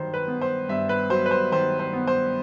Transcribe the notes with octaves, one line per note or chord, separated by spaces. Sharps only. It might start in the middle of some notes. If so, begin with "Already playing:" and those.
Already playing: G2 D#3 F#3 C5
B4
B3
C5
G2 E5
B4
F#3 C5
B4
C5
D#3 C5
C5
B3
C5